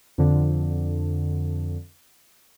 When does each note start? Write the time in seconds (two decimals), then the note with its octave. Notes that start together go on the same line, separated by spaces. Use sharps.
0.18 F2 D3